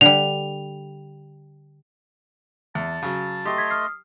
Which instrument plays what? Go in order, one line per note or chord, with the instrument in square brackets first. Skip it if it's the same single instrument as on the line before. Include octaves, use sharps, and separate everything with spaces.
[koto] D3 G3 [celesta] F7
[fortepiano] E2 [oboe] A5
[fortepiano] C#3 F#3
[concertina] A3 D#5 C6 [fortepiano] G4
[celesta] G#6 B6
D#6 F6 C7